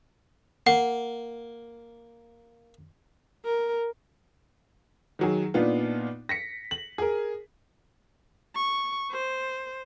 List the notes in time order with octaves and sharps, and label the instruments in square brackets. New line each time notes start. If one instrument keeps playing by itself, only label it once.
[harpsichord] A#3 [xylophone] F#5
[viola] A#4
[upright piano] D#3 F#3 G#4
A#2 B3 D4 D#4 F4
A#6 B6 C#7
F#7
G#4 A#4
[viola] C#6
C5